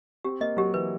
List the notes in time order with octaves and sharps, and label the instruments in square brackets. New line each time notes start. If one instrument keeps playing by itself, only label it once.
[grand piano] C4 [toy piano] G4
[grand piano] A#3 [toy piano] D#5
[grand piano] F#3 [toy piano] G4
[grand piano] E3 [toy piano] B4